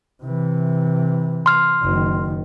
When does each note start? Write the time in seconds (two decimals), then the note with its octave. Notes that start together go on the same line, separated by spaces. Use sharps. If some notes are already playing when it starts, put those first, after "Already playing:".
0.23 C3 E3
1.46 C6 F6
1.83 F#1 D#3